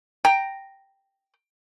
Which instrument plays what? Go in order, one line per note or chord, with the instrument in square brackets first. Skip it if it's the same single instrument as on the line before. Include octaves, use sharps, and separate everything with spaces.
[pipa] G5 A#5